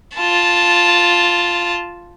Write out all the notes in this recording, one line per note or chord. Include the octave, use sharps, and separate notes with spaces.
F4 A5